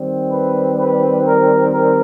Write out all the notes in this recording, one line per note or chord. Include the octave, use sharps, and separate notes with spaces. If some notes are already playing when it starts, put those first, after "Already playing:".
Already playing: D#3 G3 C4
B4
B4
A#4
A#4